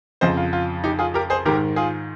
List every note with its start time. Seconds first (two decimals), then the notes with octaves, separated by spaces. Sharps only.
0.21 F2 C#3 C5 D#5
0.37 F4
0.53 F4
0.84 D#4 G4
0.99 F4 G#4
1.14 G4 A#4
1.30 G#4 C5
1.45 G#2 D#3 G4 A#4
1.76 F4 G#4